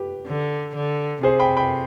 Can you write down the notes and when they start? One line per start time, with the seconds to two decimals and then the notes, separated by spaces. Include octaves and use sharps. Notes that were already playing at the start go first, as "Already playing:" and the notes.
Already playing: G4 B4
0.27 D3
0.75 D3
1.23 C3 G#4 C5
1.40 G5 B5
1.57 G5 B5